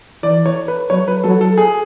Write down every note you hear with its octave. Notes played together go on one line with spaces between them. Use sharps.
E3 D5
C#5
B4
F#3 C#5
B4
F#3 A4
A4
G#4